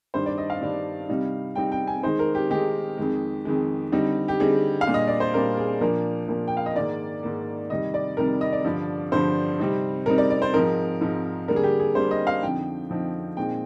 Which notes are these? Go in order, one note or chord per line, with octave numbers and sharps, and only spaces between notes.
G2 D#3 G3 D4 C5
D5
D#5
F5
G2 D#3 G3 D4
C3 G3 C4 D#4
C3 G3 C4 D#4 G5
G5
G#5
D#3 G#3 D#4 C5
A#4
G4
D#3 G#3 D#4 G4
F2 D#3 G#3
F2 D#3 G#3
D3 G3 C4 D#4
G4
D3 G3 C4 D#4 G#4
F5
A#2 G3 D4
D#5
D5
C5
A#2 G3 D4 A#4
G#4
A#2 F3 A#3 D4 A#4
A#2 F3 A#3 D4
G5
F5
D#5
G#2 D#3 A#3 D5
G#2 D#3 A#3
F2 C3 D#3 G3 D#5
D5
F2 C3 D#3 G3 A#4
D#5
D5
G2 D3 F3
G2 D3 F3 C5
C3 G3 C4 D#4
C3 G3 C4 D#4 A#4
D5
D5
C5
G#2 F3 C4 D#4 A#4
G#2 F3 C4 D#4
D3 G3 A#3 D4 A#4
G#4
G4
G#4
D3 G3 A#3 D4 C5
D#5
F5
F2 D3 F3 C4 D#4 G5
F2 D3 F3 C4 D#4
A#2 G#3 C4 D#4 G5